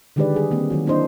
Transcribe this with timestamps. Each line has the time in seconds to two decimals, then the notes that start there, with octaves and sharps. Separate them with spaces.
0.16 D3 D#3 G#3 G4 B4 D5
0.34 G3 G#4
0.51 D#3 A#3 C4
0.70 D#3 F#3 F#4
0.86 A#3 D4 E4 C5 D#5